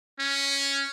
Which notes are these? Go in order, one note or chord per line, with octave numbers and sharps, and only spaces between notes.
C#4